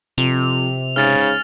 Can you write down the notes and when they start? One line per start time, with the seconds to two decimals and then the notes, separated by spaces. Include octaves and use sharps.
0.18 F2 C3 F7
0.96 G#2 C#3 F6 A6